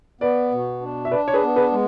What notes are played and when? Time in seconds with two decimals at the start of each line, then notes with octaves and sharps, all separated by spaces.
0.21 B3 B4 D5
0.51 B2
0.81 D4
1.05 E5
1.11 D4 B4 D5
1.28 C#5
1.34 G#4 B4
1.42 B3
1.56 G#4 B4
1.72 G#3